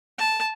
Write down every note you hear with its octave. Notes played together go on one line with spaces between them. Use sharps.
A5